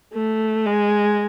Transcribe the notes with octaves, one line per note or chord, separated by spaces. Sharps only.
A3
G#3